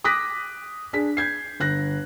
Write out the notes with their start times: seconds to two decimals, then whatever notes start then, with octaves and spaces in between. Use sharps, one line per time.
0.04 D6 D#6 F#6 A#6 B6
0.93 D4 G#4 B6
1.17 G6 G#6 C7
1.60 G1 F#6 A#6